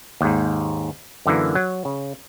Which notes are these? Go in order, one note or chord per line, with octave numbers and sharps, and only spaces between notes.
D#2 G#2
F#2 D3 E3 A#3
F#3
C#3